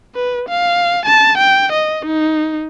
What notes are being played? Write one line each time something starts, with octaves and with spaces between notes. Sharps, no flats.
B4
F5
A5
G5
D#5
D#4